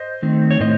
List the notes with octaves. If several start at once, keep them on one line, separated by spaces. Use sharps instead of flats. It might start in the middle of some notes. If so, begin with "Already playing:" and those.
Already playing: C5 D#5
D#3 A3 C4
C#5
A2 C5 D#5